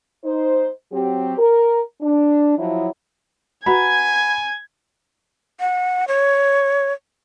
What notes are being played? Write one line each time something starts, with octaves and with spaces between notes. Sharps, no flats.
D#4 C5
F#3 C4 G4
A#4
D4
F3 F#3 E4
F#4 B4 G#5 A#5 B5 G#6
F#5
C#5